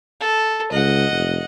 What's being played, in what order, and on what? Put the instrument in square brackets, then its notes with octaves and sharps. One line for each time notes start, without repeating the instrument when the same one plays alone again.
[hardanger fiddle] A4
[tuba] C#2 [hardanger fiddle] D#5 F#5
[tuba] F1